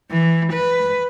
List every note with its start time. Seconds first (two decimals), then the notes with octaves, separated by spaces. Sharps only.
0.11 E3
0.53 B4